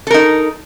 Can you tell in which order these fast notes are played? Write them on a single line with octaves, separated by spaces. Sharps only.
A4 A#4 D#4